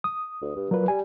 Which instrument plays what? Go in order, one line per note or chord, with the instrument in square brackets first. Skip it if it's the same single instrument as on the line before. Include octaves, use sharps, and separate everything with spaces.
[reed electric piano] D#6
[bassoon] D2
G2
[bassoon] A#2 [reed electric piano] F#3 B4
[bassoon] G3 [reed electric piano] G#5